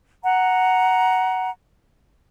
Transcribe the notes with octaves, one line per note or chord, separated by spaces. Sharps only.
F#5 A#5